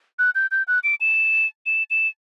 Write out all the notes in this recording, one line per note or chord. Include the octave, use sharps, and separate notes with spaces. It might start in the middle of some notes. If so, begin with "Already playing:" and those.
F#6
G6
G6
F#6
D7
E7
E7
E7